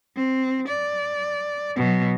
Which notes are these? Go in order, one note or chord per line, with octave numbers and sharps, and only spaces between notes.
C4
D5
B2 F#3